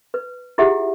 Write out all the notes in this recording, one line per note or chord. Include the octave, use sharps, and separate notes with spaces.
B4
E4 F4 G4 G#4 E5 F#5